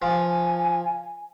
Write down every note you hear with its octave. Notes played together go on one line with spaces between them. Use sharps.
F3 G#5